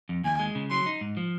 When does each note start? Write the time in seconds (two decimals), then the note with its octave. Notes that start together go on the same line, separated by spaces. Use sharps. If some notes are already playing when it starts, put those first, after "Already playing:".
0.09 F2
0.24 D#2 G#5
0.39 G#3
0.55 C#3
0.70 F#3 C6
0.86 D#4
1.01 G#2
1.17 F3